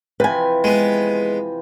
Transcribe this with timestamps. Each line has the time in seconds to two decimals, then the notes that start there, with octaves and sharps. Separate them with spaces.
0.20 C3 E3 F3 B4 G#5
0.64 G#3 B3